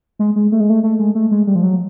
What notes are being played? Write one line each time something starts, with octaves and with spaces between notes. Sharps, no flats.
G#3
G#3
A3
G#3
A3
A3
G#3
A3
G#3
G3
F3
F#3